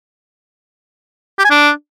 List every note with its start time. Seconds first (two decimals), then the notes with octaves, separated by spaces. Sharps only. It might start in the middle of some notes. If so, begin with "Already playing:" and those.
1.39 G4
1.45 G#5
1.51 D4